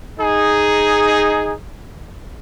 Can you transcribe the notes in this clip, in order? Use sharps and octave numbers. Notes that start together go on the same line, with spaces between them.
D#4 G#4